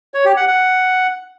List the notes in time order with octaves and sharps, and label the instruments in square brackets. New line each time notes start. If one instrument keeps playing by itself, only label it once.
[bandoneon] C#5
G4
F#5
F#5